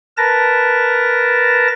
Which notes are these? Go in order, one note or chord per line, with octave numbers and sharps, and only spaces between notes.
A#4 B4 A5 A#6